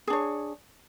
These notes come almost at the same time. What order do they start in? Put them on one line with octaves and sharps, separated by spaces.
G#4 D4 C#5